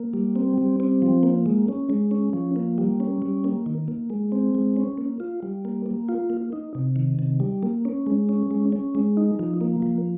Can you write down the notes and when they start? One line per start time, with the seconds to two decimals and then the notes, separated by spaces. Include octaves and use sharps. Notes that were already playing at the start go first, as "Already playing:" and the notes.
Already playing: A#3
0.14 G3
0.36 C4
0.58 G3
0.80 C4
1.02 F3
1.23 A#3
1.46 G#3
1.68 C#4
1.90 G#3
2.11 C#4
2.33 F3
2.56 A#3
2.78 G3
3.00 C#4
3.22 G3
3.44 A#3
3.66 D#3
3.88 A#3
4.10 G#3
4.32 C4
4.55 G#3
4.76 C#4
4.98 A#3
5.20 F4
5.42 G3
5.65 A#3
5.86 A#3
6.09 F4
6.30 A#3
6.52 D#4
6.75 C3
6.96 D#3
7.19 C3
7.40 G3
7.63 A#3
7.85 C#4
8.06 G#3
8.29 C#4
8.51 G#3
8.72 C#4
8.95 G#3
9.17 D#4
9.39 F3
9.61 A#3
9.82 F3